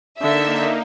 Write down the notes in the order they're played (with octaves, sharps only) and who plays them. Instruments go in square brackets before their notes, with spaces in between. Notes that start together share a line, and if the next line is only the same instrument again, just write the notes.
[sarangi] D3 [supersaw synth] A#3 D#4 [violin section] E5